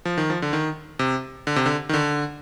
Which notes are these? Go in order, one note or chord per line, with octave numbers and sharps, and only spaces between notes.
F3
D#3
F3
D3
D#3
C3
D3
C3
D3
D#3
D3